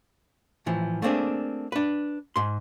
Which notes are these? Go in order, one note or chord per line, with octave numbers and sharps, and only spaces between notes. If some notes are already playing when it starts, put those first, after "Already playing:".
A2 E3 F3
A3 A#3 C4 D4 G#4
D4 B4
G#2 C6